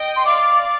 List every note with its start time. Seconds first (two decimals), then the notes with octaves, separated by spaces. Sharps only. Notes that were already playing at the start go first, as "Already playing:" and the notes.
Already playing: D#5 G5
0.16 C6
0.25 D5 F5 D6